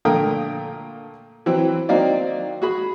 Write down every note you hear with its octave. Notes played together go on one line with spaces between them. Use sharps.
A#2 D3 A3 A#4 G5 D#6
E3 F#3 C4 E4
D#3 F#3 A#3 C4 D#4 D5
F#4 G#4 B5